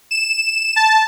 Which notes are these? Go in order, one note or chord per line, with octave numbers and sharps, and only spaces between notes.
E7
A5